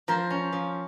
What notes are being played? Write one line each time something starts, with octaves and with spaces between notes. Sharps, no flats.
F3 A#4 C5
C#4
F3